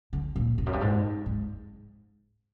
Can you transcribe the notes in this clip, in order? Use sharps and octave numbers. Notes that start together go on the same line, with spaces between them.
D3
A#2
F2
F#2
G2
G#2
G#2